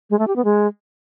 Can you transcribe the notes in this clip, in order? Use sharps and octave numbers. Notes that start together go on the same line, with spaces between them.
G#3
A3
G4
B3
G#3